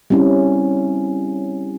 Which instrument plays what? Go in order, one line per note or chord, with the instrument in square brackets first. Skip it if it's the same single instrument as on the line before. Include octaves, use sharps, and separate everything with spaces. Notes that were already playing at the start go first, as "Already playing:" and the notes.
[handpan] G3 C4 C#4 E4